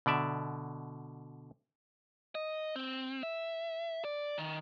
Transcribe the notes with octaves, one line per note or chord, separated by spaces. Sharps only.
B2 D3 D5 E5
D#5
C4
E5
D5
D#3